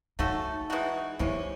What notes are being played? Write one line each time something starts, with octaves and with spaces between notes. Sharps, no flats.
A3 C#4 D#4 F#4 A4
E3 G#3 D#4 F#4
C3 E3 G#3 C#4 E4